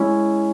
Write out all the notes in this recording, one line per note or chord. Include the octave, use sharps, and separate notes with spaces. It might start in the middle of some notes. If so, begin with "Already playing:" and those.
Already playing: G#3 C#4 E4